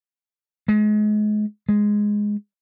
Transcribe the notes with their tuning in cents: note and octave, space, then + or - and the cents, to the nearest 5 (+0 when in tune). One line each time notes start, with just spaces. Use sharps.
G#3 +30
G#3 +0